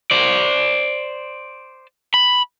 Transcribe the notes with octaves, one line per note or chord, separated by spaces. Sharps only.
C5 D5
B5